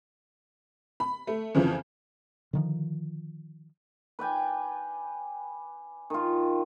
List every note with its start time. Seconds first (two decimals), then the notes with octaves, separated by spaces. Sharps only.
1.00 B5
1.27 A3
1.55 F2 C#3 E3 F3
2.53 D3 D#3 F3
4.19 B4 D5 G5 G#5
6.10 D#3 F4